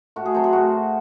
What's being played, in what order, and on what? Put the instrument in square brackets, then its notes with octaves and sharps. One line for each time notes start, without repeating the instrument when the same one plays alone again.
[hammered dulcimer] A2 F#4
G#4
F#3 A3 C4 C5
G#4
A2 F#4